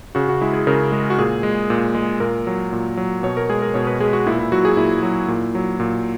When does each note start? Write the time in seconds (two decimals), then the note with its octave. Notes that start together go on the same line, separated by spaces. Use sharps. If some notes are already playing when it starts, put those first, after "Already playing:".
0.15 C#3 F#4
0.29 F#4
0.42 G#3 E4
0.53 G#4
0.67 C#3 A#4
0.92 G#3
1.10 F#4
1.19 A#2 G#4
1.43 G#3
1.70 A#2
1.95 G#3
2.20 A#2 A#4
2.47 F#3
2.73 A#2
2.97 F#3
3.23 B2 C#5
3.37 A#4
3.49 G#3 G#4
3.62 A#4
3.74 B2 C#5
3.87 B4
4.00 G#3 G#4
4.13 F#4
4.27 A#2 E4
4.39 E4
4.52 F#3 F#4
4.65 G#4
4.77 A#2 E4
5.03 F#3
5.28 A#2
5.55 F#3
5.80 A#2